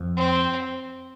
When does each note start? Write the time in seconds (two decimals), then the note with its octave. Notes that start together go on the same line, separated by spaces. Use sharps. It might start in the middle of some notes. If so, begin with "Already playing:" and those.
Already playing: F2
0.16 C4